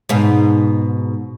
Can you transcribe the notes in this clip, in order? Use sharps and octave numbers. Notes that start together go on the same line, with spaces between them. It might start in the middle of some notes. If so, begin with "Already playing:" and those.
G#2 B2